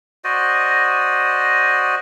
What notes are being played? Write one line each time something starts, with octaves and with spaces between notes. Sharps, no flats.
F#4 C5 D5 D#5